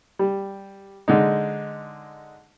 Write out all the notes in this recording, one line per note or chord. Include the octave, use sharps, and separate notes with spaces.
G3
D3 G#3 D#4